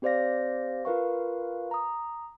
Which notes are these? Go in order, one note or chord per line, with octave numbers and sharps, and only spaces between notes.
C4 G4 C5 D5 F5 A#6
F4 A#4 B4 F5 C#6
A#5 D#6